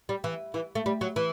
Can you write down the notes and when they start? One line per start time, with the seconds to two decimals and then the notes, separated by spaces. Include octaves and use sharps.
0.09 G3
0.24 E3
0.54 E3
0.75 A3
0.86 G3
1.01 F#3
1.16 E3